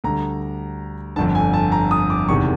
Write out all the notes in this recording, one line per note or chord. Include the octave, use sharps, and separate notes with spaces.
D2 D3 G3 A#5
G1 F2 D3 A5
G#5
A5
A#5
D#6
D6
F#1 E2 C3 D#3 C#6